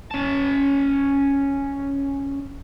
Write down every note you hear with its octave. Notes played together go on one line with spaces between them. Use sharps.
C#4 A5